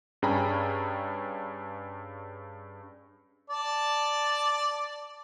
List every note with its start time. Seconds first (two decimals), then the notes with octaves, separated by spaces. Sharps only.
0.22 G2 C#4 G#4 G5 A#5 B5
3.50 D5 A5